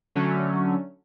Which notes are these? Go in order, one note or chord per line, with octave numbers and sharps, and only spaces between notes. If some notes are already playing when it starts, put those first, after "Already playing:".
D3 F#3 A3 C#4